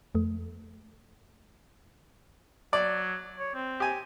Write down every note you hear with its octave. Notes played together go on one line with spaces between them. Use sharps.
F2 A3
F#3 D5
C#5
C4
G4 G#5